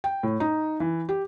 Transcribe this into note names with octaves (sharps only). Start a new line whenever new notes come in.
G5
A2
D#4
E3
G4